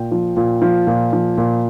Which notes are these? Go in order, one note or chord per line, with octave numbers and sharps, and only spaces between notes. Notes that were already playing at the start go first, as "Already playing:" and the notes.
Already playing: A#2 G5
F3
A#2
F3
A#2
F3
A#2